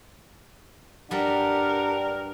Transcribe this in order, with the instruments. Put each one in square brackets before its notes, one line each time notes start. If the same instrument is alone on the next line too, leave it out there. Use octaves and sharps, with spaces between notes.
[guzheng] G2 G3 [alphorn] D4 [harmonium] G4 F#5 [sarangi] A#4